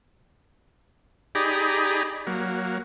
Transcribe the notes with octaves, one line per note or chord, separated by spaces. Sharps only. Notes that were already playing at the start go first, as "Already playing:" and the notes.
D#4 G4 G#4 D5 A#5 B5
F#3 A#3